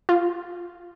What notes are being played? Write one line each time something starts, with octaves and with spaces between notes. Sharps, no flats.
F4